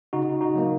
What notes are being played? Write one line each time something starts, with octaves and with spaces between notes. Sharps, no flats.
C#3 D#4 F#4
D#4 F#4
F#3 A#3